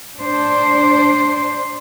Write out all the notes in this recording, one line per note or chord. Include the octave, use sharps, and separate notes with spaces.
D4 C5